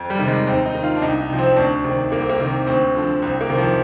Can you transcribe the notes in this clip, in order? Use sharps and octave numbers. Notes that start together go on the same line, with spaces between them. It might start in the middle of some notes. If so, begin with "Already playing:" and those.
Already playing: F2
G3
C3 D#3
G#3
D#2 C4
D#4
D#3
F4
D4
C2 D#4
D#4
C3 F3
C4
D2 D4
C3 D#3 D4
C2 A#3
C4
A#3
C3 D#3
D2 C4
D3 F3
C2 C4
A#3
C3 D#3
F3